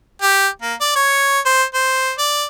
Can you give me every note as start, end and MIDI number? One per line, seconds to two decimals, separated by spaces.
0.22 0.48 67
0.62 0.74 58
0.81 0.95 74
0.96 1.40 73
1.46 1.63 72
1.74 2.12 72
2.18 2.45 74